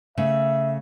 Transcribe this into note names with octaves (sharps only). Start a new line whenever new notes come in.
C#3 A3 E5